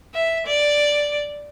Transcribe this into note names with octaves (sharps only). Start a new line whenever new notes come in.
E5
D5